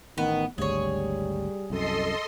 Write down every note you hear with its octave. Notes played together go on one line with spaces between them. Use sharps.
A1 D#3 B3
G#1 D2 G3 G#4 C#5
C2 F#2 A4 D#5 C6